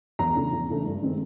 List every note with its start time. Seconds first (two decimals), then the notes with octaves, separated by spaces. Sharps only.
0.19 E2 A#5
0.35 C#3 E3 A3 D4
0.53 E2
0.70 C#3 E3 A3 D4
0.86 G2
1.02 D#3 G#3 C4